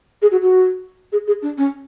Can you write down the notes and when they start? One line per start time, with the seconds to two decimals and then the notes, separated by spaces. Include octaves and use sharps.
0.22 G#4
0.31 F#4
0.41 F#4
1.12 G#4
1.27 G#4
1.42 D4
1.57 C#4